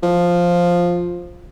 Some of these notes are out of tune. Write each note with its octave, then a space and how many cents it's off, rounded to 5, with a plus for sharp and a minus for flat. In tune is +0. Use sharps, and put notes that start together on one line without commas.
F3 +5